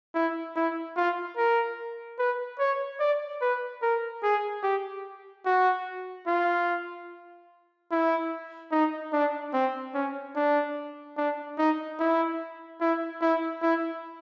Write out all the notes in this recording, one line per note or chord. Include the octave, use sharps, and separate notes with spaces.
E4
E4
F4
A#4
B4
C#5
D5
B4
A#4
G#4
G4
F#4
F4
E4
D#4
D4
C4
C#4
D4
D4
D#4
E4
E4
E4
E4